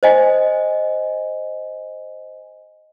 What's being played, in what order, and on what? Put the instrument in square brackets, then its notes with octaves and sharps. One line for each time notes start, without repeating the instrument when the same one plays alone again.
[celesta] C5 D#5 G#5